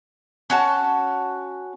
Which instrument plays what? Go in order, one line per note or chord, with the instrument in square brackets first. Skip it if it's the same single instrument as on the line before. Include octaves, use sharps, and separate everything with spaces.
[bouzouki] C#4 F#4 A5